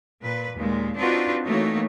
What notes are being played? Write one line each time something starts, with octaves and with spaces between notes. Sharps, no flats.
A#2 B4
D#2 A#2 G#3
C4 D4 D#4 F4 F#4 B4
E3 A3 A#3 D#4 F#4 C#5